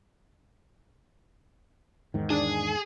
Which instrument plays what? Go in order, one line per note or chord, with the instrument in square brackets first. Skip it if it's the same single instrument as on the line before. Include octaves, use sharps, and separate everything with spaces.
[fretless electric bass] E2 G#2 D#3
[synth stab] D4 [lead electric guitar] G#4